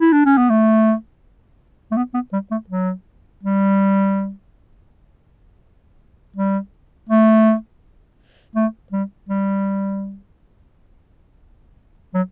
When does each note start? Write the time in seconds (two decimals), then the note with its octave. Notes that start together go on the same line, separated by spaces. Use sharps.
0.00 E4
0.13 D4
0.25 C#4
0.38 B3
0.50 A3
1.91 A3
1.97 B3
2.14 B3
2.33 G3
2.51 A3
2.70 F#3
3.43 G3
6.36 G3
7.09 A3
8.55 A3
8.92 G3
9.29 G3
12.14 F#3